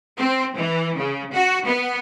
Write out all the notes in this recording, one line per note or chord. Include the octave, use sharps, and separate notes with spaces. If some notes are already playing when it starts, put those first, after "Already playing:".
C4
E3
C#3
F#4
B3